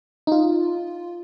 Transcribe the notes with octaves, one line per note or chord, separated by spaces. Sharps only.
D#4
F4